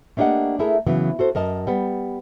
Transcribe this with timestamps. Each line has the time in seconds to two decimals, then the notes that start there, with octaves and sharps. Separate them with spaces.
0.17 A3 A#3 D4 G4 D#5 F#5
0.59 A3 E4 G#4 A#4
0.86 C#3 E3 F#3 B3
1.19 F#4 A4 C5
1.35 F#2 A#4 D#5 A5
1.67 G3 B3